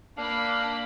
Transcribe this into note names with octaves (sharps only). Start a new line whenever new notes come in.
A#3 D4 F5 B5